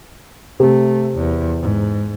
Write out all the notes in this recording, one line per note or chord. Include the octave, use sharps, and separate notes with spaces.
C3 A3
E2
G#2